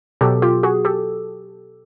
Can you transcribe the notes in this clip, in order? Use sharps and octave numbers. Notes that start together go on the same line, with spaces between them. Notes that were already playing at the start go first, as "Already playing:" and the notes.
B2 F#3 G4 A4
F4 G4
F#4 G#4
G4 A4